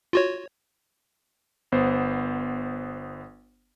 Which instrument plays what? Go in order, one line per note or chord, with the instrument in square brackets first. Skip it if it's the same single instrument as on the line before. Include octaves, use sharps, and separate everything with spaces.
[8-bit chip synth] F4 F#4 C#5
[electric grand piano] G1 B3 C5